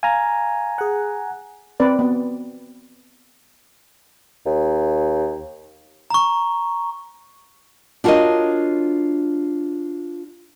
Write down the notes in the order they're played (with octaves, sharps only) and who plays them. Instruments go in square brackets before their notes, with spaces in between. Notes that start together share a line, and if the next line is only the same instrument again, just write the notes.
[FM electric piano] F5 [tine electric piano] G#5 A#5
[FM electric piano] G#4 F#5
[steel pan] C4 B4 D5
B3
[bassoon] D#2
[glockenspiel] A#5 C#6
[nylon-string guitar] D4 F4 F#4 A#4 C#5 D#5